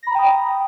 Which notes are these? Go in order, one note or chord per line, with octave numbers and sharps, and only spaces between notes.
G5 A#5 B5 D#6 A#6